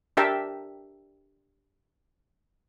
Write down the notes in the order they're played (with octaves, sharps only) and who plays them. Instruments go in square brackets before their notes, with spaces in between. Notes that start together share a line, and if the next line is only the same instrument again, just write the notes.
[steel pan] D4 G4 A#4 E5 G5 A5